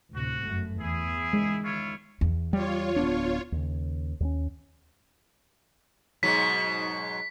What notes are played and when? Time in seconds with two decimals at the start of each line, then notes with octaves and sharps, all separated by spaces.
0.14 D2 A2 C3 F#4
0.44 G1 F#2 A3
0.80 E2 E4 G#4
1.33 G#3
1.64 D#3 E4 F4 C#5
2.21 E2
2.53 G3 F4 C#5
2.96 D1 B3 D4
3.52 D#2 C#3
4.20 D#2 G3 C#4
6.23 G#2 B2 F#3 B6